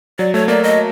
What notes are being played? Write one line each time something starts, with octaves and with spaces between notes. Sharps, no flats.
F#3 D5
A3 C#5
A#3 D5
D#5